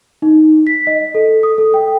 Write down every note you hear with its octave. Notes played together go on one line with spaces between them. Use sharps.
D#4
B6
D#5
A4
D#6
A4
G5